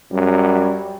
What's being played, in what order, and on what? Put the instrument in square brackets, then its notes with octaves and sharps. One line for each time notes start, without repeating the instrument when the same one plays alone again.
[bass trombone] F#2 [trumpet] G3